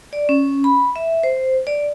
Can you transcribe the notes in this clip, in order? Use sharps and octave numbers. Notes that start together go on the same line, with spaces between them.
D5
C#4
B5
E5
C5
D5